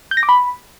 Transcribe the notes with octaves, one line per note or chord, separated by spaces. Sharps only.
G6
A#6
D6
B5